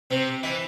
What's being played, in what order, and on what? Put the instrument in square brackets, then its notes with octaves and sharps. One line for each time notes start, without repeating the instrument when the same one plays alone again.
[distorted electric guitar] C3 [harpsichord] C4
[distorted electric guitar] E3 [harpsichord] E4